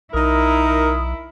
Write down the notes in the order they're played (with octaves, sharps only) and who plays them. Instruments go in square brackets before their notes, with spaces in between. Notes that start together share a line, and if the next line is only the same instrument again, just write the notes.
[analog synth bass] B1 [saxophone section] D#4 A#4 [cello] E4 [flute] D#6